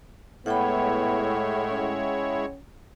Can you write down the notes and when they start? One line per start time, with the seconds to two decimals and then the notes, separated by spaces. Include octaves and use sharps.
0.46 A2 G#3 B3 E4 C#5 F#5 G5 B5
1.70 C#4